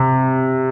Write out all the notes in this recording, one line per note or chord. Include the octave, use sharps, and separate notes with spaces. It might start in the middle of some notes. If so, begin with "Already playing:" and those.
Already playing: C3